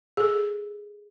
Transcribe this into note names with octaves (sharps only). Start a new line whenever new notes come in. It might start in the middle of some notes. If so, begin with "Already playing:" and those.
G#4 A4